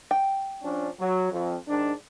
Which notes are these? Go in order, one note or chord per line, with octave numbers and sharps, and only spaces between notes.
G5
F3 C#4 D4
F#3
F2
G#2 D#3 D4